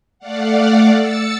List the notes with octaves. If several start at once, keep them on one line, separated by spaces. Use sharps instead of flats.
A3 D5 F5 F#5
E6 A6 C#7